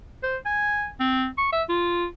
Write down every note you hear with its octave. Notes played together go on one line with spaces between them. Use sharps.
C5
G#5
C4
C#6
E5
F4